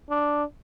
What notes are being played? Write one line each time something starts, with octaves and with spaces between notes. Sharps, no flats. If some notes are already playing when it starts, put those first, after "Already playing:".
D4